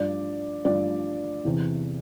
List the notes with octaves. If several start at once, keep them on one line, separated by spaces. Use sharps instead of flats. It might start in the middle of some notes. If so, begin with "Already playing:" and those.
Already playing: G2 F3 D5
G2 F3 D5
E2 C3 E3